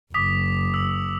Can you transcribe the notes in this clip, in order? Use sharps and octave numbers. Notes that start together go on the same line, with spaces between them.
F#1 D6 D#6 B6
E6 B6 F#7